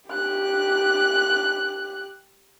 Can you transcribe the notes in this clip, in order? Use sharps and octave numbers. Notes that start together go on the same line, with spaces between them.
G4 F#6